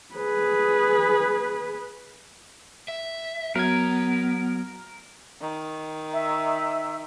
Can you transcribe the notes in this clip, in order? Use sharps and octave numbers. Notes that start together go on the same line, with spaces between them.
G#4 B4
E5
F#3 B3 A#4 G#6
D#3
E5